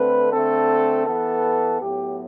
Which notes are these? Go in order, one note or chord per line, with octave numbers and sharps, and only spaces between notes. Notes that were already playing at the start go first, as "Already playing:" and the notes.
Already playing: D3 A3 C4 B4
D3 A3 C4 A4
E3 B3 A4
A2 F#3 B3 G4